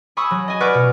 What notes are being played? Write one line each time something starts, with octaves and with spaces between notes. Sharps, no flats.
G#5 B5 C#6 D#6 E6
F#3
D#5 G#5
B4 D5 F#5 C#6 F6
B2